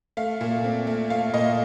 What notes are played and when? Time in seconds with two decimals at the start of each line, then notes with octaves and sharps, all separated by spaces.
0.17 A3 F5
0.41 A#2
0.64 C4
0.87 A3
1.10 A3 F5
1.34 A#2 D#5